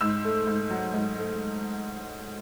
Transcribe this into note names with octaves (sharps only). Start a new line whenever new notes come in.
G#2 E6
A3
G#2
F#3
G#2
A3